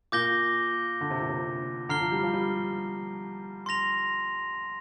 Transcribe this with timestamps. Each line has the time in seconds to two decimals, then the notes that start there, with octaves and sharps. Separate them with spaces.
0.12 A#2 D6 G6 A#6 G7
1.01 D3
1.10 C3
1.20 A#2
1.30 C3
1.89 D3 A#5 F6 C7 G7
2.01 F3
2.12 G3
2.23 F3
2.34 G3
3.66 C6 A#6 F7